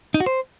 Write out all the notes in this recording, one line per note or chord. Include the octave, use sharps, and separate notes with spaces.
D#4
F#4
C5